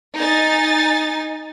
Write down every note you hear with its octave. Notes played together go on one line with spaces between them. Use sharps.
D#4 G#5 A6